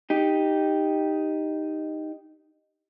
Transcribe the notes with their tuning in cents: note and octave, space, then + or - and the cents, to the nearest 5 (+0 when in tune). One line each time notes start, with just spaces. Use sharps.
D#4 +0 G4 +5